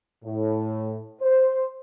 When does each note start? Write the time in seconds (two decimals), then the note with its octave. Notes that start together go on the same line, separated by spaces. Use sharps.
0.24 A2
1.21 C5